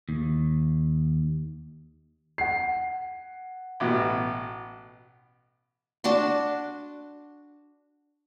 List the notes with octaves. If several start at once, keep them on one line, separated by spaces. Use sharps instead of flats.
D#2
F#5 C7
A1 B2
D4 F#4 A5 C6